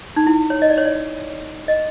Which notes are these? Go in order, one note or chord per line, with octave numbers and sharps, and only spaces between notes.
D#4
E4
C#5
D#5
D5
C#5
D5
D#5